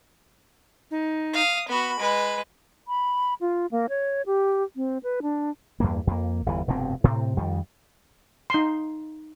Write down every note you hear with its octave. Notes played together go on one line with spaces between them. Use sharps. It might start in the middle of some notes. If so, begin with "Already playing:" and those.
D#4
F5 D#6
B3 F#4 B5
G#3 B4
B5
F4
A#3
C#5
G4
C4
B4
D4
E2 G2 A#3
F2 A#3
G1 E2 E3
F1 G2 B2 C4
A2 C3 C4
F2 D#3 G3
D#4 C6